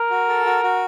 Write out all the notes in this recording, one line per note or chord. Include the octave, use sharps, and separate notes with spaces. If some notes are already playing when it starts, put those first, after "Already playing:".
Already playing: A#4
F#4
A4
F#4
F#4